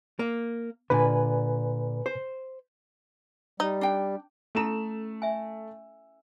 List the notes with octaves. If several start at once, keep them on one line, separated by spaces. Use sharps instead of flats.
A#3
A#2 D3 B4 G#5
C5
G3 D#4
D4 G5
A3 C#4 E4 A4 E7
E5 G#5